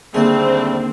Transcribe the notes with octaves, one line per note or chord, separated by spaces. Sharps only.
D#2 D3 G3 A3 A#3 C4 G#4